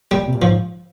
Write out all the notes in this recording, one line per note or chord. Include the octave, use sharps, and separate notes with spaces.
A#2 G3
C3
A#2
G#2 F3